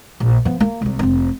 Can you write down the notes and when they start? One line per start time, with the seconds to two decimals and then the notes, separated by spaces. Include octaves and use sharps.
0.20 A#1
0.45 F3 B3
0.60 A#3
0.82 C2 G3
0.99 F1 C4